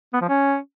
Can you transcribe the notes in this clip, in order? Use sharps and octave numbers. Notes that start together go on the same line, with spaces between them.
B3
F3
C#4